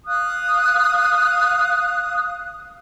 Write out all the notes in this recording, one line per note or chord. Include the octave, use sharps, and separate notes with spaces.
F5 D#6 F#6